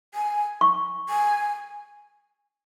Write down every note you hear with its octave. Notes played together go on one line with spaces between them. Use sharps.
G#5
C#6
G#5